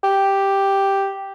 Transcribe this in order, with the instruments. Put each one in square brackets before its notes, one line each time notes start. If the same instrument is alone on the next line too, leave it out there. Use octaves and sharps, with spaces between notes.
[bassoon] G4